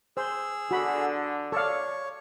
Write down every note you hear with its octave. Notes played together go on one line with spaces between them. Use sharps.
G#4 C5 E6
D3 F#4 B5
A4 C#5 D5 F5